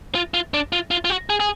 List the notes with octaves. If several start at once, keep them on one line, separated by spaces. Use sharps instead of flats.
F4
F4
D4
F4
F4
F4
F#4
G#4
G#4